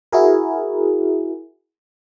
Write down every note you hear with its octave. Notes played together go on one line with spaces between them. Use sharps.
E4 F#4 G#4 A#4